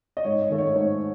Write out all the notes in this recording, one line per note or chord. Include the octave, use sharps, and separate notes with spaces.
D#5
G#2 C#5
D#5
D#3 A3
C#5
G#2 C5